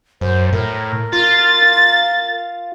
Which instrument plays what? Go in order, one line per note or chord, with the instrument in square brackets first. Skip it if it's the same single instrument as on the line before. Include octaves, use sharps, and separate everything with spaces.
[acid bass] F#2 [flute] C5
[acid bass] A2 [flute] A#4
[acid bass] F4 [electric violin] A6